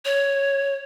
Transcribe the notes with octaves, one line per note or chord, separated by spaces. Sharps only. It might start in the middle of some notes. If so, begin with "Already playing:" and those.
C#5